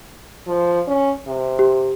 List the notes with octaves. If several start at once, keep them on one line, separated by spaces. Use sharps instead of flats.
F3
C#4
C3
G4